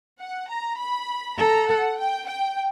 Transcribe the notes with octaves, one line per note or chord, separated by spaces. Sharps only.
F#5
A#5
B5
A4 A#5
F#5
G5
G5